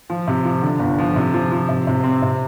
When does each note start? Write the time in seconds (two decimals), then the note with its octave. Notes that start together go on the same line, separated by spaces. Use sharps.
0.10 F3
0.27 C3
0.45 F3
0.62 D3
0.79 G1
0.98 F3
1.16 C3
1.34 F3
1.52 F3
1.69 C3
1.87 C3
2.04 C4
2.22 C3